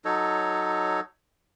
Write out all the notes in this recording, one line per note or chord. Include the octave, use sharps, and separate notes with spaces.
F#3 D#4 A4 C#5